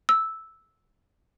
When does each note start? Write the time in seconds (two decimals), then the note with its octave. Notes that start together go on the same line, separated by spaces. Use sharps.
0.09 E6